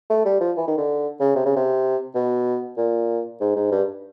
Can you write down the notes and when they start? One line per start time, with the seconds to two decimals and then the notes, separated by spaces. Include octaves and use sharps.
0.09 A3
0.25 G3
0.41 F3
0.57 E3
0.67 D#3
0.78 D3
1.20 C#3
1.35 C3
1.45 C#3
1.56 C3
2.14 B2
2.77 A#2
3.40 G#2
3.56 G#2
3.72 G2